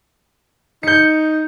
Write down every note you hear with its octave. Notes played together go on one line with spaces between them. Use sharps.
D#4 G6 C#7